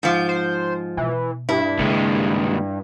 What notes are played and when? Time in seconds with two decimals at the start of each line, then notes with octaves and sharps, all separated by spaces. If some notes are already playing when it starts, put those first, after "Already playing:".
0.03 G#2 F3 G6
0.29 C5
0.97 B2 E3
1.49 G2 E4
1.78 D#2 C#3 G#3 C4